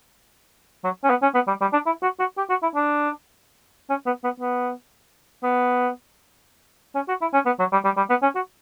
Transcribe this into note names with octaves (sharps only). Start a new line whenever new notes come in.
F#3
C#4
B3
C#4
B3
G3
G3
D4
E4
F#4
F#4
G4
F#4
E4
D4
C#4
B3
B3
B3
B3
C#4
F#4
E4
C#4
B3
F#3
G3
G3
G3
B3
C#4
F#4